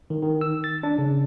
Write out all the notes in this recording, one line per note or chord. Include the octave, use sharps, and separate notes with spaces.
D#3
D#3
E6
A6
D4
C#3